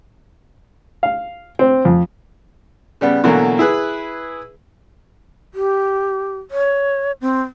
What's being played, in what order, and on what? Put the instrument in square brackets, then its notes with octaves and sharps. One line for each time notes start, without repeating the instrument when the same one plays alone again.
[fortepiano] F5
C4
F2
C#3 G3 B3
B2 D3 E3 F#3 A3 A#3
E4 G#4 B4
[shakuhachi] G4
C#5
C4